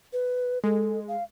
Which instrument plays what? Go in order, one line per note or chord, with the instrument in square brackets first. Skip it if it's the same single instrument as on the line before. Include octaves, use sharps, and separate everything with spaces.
[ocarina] B4
[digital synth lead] G#3 [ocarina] A4
[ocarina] F5